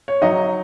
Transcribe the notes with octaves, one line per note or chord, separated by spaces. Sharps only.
C#5
F#3 D#4 D#5